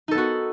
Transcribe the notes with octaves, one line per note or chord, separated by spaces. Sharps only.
B3 D#4 F#4 A4